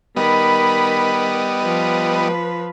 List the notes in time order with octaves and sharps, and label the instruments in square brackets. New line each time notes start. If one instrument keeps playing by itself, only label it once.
[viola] D#3 B5 [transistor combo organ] G3 B3 D#5
[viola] F3 B4